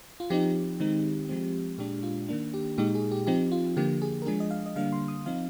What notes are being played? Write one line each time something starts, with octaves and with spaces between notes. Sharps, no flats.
F4
F3 C4 D#4 G4
D#3 G#3 C4 D#4
F3 G#3 C4
A#2 G#3 D4 G4
F4
D#3 A#3 D4
G4
A#2 G#3 D#4 G4
G#4
G4
F3 C4 D#4 G4
F4
D3 F3 A#3 G4
G#4
A#4
F3 G#3 D4 G#4
D#5
F5
D#5
D3 G3 A#3 D4 F5
C6
D#6
F3 C4 D#4 F5